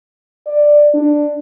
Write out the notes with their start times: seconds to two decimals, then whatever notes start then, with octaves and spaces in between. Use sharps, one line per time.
0.46 D5
0.94 D4